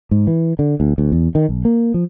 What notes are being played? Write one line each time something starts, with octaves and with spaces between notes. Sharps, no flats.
G#2
E3
D3
D2
D2
E2
D#3
B1
A#3
F3